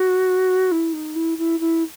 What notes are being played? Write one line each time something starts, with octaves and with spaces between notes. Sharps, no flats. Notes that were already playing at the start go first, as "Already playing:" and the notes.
Already playing: F#4
E4
D#4
E4
E4
E4